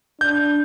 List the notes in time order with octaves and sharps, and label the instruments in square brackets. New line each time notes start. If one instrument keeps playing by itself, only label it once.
[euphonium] D4 [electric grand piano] G6